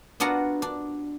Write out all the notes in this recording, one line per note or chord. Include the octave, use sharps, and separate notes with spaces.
B3 D4 F4 F#4 F#5 A#5
D4